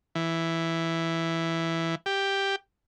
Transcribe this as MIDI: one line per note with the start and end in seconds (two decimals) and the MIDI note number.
0.15 1.95 52
2.06 2.56 67